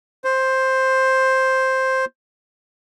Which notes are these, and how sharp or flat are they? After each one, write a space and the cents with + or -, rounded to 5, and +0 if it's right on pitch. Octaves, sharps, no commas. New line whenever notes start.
C5 +5